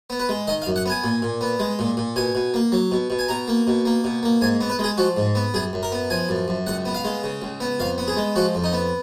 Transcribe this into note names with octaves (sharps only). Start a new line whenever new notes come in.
B3
B4
G#3
D#3 D#5
F5
F#2
F#5
B3 G#5
A#2
A#2
B3
G#3
A#2
A#2
B2 G#5
B2
A#3
F#3
B2
B2
G#5
B2 A#5
A#3
B2
A#3
B2
A#3
G#2 G#5
B3
B4
G#3 G#4
F3 F#4
G#2
B3
F#2 G#4
F#2
A#4
B3
F3 G#5
F#2
F#2
C#2 F#5
B3
F5
G#3
C#3
C#2
B3
F2 F5
B3
G#4
G#3
F3 F#4
F2
D#4
B3